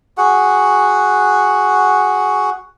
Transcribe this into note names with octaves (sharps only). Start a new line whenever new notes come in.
F#4 G#4 F#5